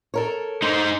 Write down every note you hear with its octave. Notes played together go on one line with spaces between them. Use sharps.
A4 A#4 C#5
D#4 C5